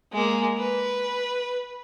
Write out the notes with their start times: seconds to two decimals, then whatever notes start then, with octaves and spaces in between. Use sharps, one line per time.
0.12 G#3 A#3
0.58 B4